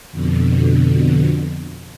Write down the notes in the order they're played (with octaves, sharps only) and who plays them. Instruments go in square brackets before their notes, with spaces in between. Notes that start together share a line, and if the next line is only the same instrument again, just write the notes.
[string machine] F2 B2 D3